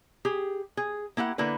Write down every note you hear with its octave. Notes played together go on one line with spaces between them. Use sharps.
G4 G#4
G#4
A#3 E4 G4 F#5
D3 A#3 E4 B4